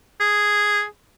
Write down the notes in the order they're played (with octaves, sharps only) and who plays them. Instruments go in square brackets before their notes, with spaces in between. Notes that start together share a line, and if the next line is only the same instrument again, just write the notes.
[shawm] G#4